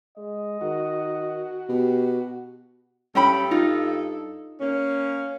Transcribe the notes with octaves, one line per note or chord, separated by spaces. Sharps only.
G#3 D#5
D#3 F#4
B2 G4
G2 C#4 A4 G5 B5
D#4 F4
A#3 C#4